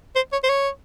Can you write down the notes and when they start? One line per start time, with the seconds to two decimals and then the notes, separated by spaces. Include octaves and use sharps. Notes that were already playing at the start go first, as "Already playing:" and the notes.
0.16 C5
0.32 C#5
0.43 C5
0.49 C#5